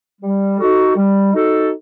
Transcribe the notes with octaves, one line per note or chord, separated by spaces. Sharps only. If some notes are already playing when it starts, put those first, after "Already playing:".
G3
D#4 F#4 A4
G3
D#4 F#4 A4